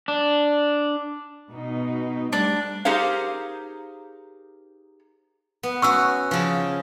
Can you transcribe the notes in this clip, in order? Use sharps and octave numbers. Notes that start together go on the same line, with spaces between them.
D4
B2 D#4
G3 A3 D4
D#4 G4 G#4 A#4 C5 F5
B3
C#4 F#4 C#6 E6
C#3 F3